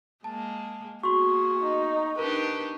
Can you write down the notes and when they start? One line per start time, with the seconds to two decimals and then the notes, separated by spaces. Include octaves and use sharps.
0.24 G#3 A#3 A5
1.03 A#3 B3 F#4 G#4 C6 C#6
1.60 D#4
2.19 D4 D#4 G4 A#4 B4